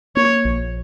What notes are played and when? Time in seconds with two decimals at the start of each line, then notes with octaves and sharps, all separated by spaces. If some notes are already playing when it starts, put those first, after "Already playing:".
0.16 A#3 C#5
0.45 A#1